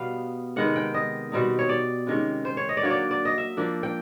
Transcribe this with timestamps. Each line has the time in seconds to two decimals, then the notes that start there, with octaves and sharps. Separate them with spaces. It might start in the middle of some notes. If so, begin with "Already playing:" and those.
Already playing: B2 G3 B3 F5
0.56 C3 D#3 G#3 B3 F#5
0.76 G5
0.94 D#5
1.32 B2 G3 C4 D#4
1.59 C#5
1.69 D5
2.07 C3 D#3 G#3 C#4
2.45 C5
2.57 C#5
2.69 D#5
2.77 D5
2.83 D3 F#3 A#3 C#5
2.91 D5
3.11 D5
3.25 D#5
3.38 E5
3.57 F3 A#3 D4
3.83 G5